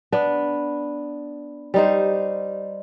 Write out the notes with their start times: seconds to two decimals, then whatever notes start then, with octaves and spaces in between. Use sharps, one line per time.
0.12 B3 D4
1.74 G3 D#4 C5